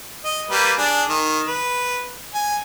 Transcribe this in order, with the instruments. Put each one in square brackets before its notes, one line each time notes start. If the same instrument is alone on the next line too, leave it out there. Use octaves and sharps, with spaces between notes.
[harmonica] D#5
G3 A#3 B4
D4 G#4
D#3
B4
G#5